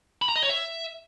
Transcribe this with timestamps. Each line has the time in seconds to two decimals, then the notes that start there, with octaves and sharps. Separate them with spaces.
0.22 B5
0.29 A#5
0.36 D#5
0.43 C#5
0.49 E5